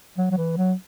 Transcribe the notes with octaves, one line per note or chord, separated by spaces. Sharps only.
F#3
F#3
E3
F#3